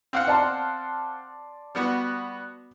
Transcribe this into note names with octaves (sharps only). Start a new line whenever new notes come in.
C4 F5 F#5
D5 A5 C6
G3 B3 F#4